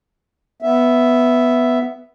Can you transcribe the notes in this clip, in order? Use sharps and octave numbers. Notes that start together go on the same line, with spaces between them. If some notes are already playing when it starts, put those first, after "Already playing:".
B3 E5